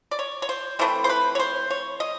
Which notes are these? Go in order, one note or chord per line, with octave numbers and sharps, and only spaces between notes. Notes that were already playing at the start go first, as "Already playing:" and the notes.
D5
C#5
C#5
C5
E3 A3 C4 C5
C5
B4
C#5
C5
C#5
D#5